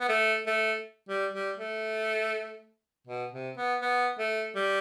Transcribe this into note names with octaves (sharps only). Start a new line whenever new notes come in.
B3
A3
A3
G3
G3
A3
B2
C3
B3
B3
A3
G3